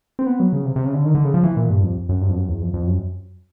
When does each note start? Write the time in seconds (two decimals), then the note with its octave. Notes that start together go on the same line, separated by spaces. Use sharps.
0.19 C4
0.26 B3
0.40 F#3
0.53 C#3
0.66 C3
0.76 C3
0.85 C#3
0.94 D3
1.05 D#3
1.15 D3
1.24 C#3
1.34 F3
1.43 E3
1.57 A#2
1.70 G2
1.83 F2
2.09 F#2
2.22 G2
2.29 F2
2.35 F#2
2.49 E2
2.62 F2
2.74 F2
2.87 F#2